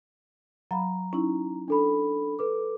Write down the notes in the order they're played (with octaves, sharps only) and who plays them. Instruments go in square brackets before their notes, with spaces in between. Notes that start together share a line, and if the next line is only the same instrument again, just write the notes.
[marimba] F#3 F5 B5 [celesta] A#5
[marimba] C#4 D#4 E4
[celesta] D4 A4 B5
A4 B4 D6